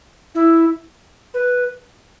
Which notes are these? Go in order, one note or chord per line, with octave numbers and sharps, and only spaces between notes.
E4
B4